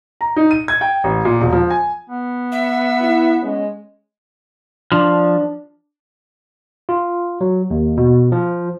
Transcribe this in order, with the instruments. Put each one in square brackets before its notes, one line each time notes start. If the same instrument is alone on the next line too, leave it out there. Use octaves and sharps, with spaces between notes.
[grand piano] A#5
D#4
D#7
G#6
G5
A1
A#2
E1
F3
G#5
[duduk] B3
[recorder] E5
[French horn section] E4
G#3 C#4
[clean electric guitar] F3 [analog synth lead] D4
[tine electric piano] F4
F#3
D#2
B2
F3